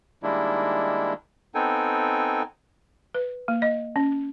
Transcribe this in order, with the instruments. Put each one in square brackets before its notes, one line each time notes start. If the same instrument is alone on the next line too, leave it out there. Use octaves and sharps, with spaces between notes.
[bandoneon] D#3 G3 G#3 A#3 D4 E4
B3 C4 D#4 A4 G5 G#5
[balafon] B4
A#3
D#5
C#4